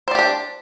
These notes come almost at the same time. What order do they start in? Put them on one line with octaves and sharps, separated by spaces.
C5 D5 G4 D4